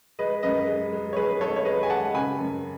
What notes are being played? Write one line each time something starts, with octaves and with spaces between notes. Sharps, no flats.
G#3 B4 D#5
F#2 B4 D#5
G#3
G#3
C#5
G#3 G#4 B4
G#3 A4 C#5
C#5
G#3 B4 D#5
G#5
G#3 F#5 A5
C#3 G#5 B5
F#2